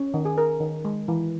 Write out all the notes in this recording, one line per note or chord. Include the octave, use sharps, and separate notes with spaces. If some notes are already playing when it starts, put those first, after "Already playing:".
Already playing: C#4
D#3
G#4
D#3 A#4
D#3
G#3
E3